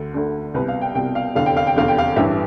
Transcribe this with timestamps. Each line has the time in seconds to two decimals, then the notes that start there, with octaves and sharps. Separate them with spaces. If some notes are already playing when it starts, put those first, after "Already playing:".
Already playing: D2 D3
0.14 D2 D3
0.54 C2 B4
0.59 B2
0.68 F5
0.81 G5
0.95 C2 B2 G5
1.15 F5
1.35 F1 E2 D3 F5
1.46 G5
1.57 F5
1.67 G5
1.76 F1 E2 D3 F5
1.88 G5
1.98 F5
2.16 A1 G2 E3 E5